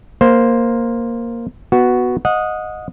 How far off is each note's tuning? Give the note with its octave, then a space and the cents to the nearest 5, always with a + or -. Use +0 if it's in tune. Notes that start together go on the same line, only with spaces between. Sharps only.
A#3 +0 C5 +0
B3 +0 F#4 +0
D#5 +0 F#5 -30